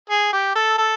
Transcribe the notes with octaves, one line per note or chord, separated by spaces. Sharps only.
G#4
G4
A4
A4